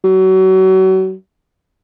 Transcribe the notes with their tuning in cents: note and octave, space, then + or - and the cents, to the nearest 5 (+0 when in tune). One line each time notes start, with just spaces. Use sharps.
F#3 +30